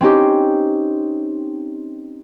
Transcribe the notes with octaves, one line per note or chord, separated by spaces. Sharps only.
C4 C#4 D#4 G4